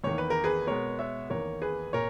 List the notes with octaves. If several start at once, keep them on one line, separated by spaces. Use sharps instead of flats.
E2 D#3 A#3 C#5
B4
A#4
G#4 B4
B2 G#3 B3 A#4 C#5
C#5 E5
E2 D#3 A#3 A#4 C#5
G#4 B4
A#2 A#4 C#5